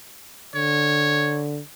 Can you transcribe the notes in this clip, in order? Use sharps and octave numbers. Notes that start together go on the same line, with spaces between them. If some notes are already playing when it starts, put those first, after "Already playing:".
D3 C#5